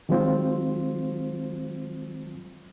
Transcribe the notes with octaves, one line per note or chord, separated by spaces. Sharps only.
D#3 F#3 G#3 C4 F4 C5